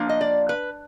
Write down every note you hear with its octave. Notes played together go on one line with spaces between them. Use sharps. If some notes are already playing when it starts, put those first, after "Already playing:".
Already playing: F3 A#3 D4
D#5
D5
B4